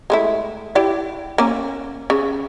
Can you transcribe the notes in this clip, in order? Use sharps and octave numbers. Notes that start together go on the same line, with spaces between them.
G#3 A3 E4
E4 G4 D5
A#3 C#4
C#3